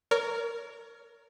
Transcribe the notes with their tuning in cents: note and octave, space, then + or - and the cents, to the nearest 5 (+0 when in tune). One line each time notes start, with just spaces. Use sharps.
A#4 -10 C#5 +30